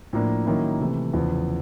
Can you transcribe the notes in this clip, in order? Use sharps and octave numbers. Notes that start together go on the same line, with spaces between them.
A2 F3 A#3 D4
D#3 F#3 A#3 C#4 E4
C3 E3 A3
E2 C#3 F3